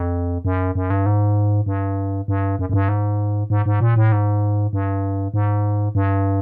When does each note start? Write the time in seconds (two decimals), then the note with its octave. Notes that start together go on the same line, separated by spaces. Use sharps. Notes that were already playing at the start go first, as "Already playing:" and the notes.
Already playing: F2
0.45 F#2
0.75 F#2
0.90 G2
1.06 G#2
1.66 G2
2.28 G2
2.59 F#2
2.69 F#2
2.74 G2
2.89 G#2
3.50 G#2
3.66 G#2
3.81 A#2
3.96 A2
4.12 G#2
4.73 G2
5.34 G#2
5.95 G2